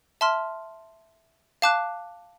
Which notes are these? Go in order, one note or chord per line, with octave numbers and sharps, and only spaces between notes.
E5 A5 C6 F6
F5 A5 D6 F#6